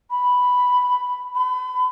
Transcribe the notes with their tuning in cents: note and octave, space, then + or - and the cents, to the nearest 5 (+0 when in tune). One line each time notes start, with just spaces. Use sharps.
B5 +0
B5 +35